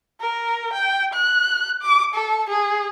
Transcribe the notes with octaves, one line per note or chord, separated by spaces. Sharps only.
A#4
G5
F#6
D6
A4
G#4